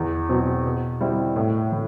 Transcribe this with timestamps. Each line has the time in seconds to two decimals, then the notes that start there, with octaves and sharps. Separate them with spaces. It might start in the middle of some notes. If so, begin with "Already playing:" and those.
Already playing: E2
0.29 B2 F#3 C4
0.65 B2
1.01 G3 C4 E4
1.36 A2
1.72 E3